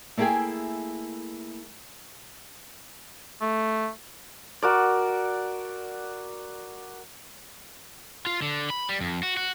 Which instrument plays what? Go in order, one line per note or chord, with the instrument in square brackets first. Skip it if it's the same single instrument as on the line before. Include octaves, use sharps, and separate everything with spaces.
[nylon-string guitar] A3 A#3 E4 G#4 G5 G#5
[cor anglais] A3
[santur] F#4 A#4 D5
[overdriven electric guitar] F4
D3
B5
G3
F2
F#4
F#4